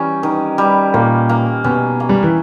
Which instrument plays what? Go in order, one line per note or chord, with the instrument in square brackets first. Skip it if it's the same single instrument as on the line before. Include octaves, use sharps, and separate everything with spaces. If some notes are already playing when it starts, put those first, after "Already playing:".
Already playing: [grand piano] E3 [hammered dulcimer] G3 C#4
[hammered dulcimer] D#3
G3
[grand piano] A#2 [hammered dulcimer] A#3
[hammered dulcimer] A#3
[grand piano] B2 [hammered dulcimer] C#4
[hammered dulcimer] A#3
[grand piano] G3
E3